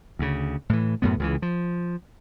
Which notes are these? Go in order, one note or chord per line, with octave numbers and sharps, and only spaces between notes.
D2 C#3
A2 E3
F#2 A2 B3
C#2 C#3 E3
F3